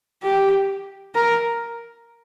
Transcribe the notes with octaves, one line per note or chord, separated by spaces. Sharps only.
G4
A#4